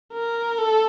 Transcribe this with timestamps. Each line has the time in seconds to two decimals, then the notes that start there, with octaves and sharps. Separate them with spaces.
0.13 A#4
0.58 A4